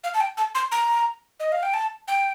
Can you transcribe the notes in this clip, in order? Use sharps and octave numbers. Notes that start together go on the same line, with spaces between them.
F5
A5
G5
A5
C6
A#5
D#5
F5
G5
A5
G5